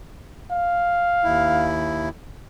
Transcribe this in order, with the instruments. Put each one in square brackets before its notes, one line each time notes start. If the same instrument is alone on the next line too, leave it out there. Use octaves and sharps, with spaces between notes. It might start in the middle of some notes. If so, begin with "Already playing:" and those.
[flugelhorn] F5
[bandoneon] D#2 E4